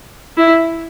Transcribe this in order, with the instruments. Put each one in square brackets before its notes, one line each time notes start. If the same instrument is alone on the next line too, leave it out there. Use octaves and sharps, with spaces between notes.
[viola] E4